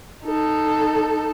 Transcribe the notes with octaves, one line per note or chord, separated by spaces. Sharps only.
D#4 A4